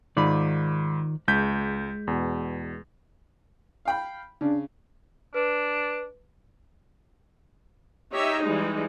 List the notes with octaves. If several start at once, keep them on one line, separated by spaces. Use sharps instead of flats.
G#2 D#3 F4 D5 B5
C#2 G#3 G6 B6
E2 B2
F5 G5 B5
C#3 D4
D4 B4
D#4 G4 C#5 E5 A#5
E3 G3 G#3 D#4